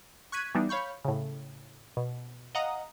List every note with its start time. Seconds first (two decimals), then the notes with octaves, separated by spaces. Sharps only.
0.32 C#6 F#6 G#6 B6 D#7
0.55 E3 G3 B3 D4 D#4
0.69 C#5 F5 B5 C#6 G6
1.05 A2 C#3
1.97 B2
2.55 D#5 F5 F#5 A#5 D#6